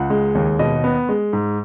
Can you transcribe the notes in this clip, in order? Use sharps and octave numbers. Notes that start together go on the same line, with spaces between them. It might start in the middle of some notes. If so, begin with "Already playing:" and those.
Already playing: C#2 F#5
G#3
D#2
B2 D#5
B3
G#3
G#2